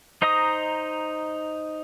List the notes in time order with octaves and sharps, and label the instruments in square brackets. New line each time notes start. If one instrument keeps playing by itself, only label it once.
[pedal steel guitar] D#4 C5 D#5 A#5 D#6